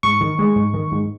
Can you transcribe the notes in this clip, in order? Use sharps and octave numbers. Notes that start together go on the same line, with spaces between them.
G#2 C#6
D#3
G#3
G#2
D#3
G#2